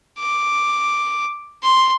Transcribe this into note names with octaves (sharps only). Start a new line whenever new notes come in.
D6
C6